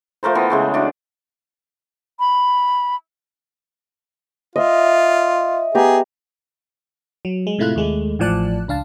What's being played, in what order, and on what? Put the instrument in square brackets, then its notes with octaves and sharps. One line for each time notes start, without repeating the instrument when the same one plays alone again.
[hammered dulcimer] F3 A3 A#4 C5
E3 B3
C#3 G#3 A3
D4 F#4
[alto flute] B5
[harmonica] F4 [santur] D#5 E5
[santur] B3 G4 A#5 [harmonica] G#4
[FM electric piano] F#3
G#3
A2 C3 A3 E4 F4 F#6
D#2 G#3 A3
A1 A2 F3 D5 A5 F#6
C#2 D4 F5 A5